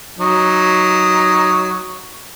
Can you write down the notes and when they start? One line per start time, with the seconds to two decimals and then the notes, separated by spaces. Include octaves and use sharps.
0.19 F#3 D#4